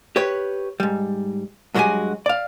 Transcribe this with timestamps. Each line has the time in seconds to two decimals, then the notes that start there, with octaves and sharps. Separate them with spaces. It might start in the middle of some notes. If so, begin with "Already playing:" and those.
0.16 G4 B4 C#5
0.80 G#2 G3
1.75 G2 F#3 G#3 F#4 G4 G#5
2.26 D5 F5